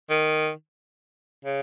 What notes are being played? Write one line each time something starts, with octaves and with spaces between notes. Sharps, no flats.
D#3
C#3